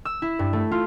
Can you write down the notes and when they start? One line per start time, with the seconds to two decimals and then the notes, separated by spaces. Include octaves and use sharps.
0.05 E6
0.22 E4
0.39 G2
0.53 A3
0.72 F4